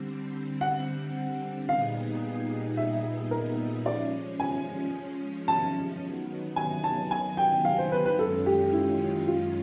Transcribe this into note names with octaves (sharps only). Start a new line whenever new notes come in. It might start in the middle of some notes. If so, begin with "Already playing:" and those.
Already playing: D3 G3 C4
F#5
A#2 G3 B3 D#4 G#4 F5
E5
A#4
F3 G#3 C#4 D5
G#5
A5
D#3 F#3 B3
G#5
A5
G#5
G5
F5
C5
B4
B4
F#2 D#3 G#3 C#4 F4 A4
G4
E4
F4